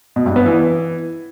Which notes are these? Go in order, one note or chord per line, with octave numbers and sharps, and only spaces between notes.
B2
G2
B3
E3